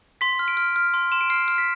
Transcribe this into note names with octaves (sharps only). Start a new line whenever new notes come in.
C6 B6
F6
D7
F6
F6
C6
C6 E7
D7
F6 C7
F6
B6